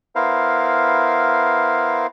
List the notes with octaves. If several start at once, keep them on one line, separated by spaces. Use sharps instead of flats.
B3 E4 A#4 C5 F5